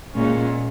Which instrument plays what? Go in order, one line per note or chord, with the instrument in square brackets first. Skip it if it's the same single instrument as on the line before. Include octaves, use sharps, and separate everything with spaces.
[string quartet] A#2 G#3 C#4